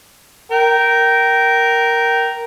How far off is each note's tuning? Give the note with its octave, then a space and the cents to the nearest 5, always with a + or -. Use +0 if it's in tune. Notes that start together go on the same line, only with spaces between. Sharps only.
A#4 +0 G5 -20